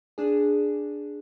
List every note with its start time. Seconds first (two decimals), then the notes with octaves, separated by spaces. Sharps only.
0.18 D4 G#4